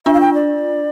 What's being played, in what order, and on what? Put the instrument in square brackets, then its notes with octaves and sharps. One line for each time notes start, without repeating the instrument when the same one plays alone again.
[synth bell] D4 F4 [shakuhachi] E5
[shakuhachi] F5
G5
D5